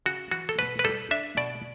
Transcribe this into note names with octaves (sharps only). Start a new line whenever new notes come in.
C#3 F#4
E3 F#4
A4
B2 B4
B4
G3 A4
D4 E5
B2 D5